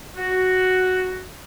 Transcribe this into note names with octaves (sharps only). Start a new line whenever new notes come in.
F#4